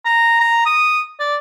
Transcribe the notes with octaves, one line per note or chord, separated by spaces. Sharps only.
A#5
A#5
D#6
D5